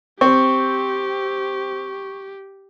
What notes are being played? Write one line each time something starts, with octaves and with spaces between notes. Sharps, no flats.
C4 G4 C#6